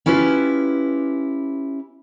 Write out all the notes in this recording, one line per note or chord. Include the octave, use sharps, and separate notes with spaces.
C#4 E4 F4 G4 B4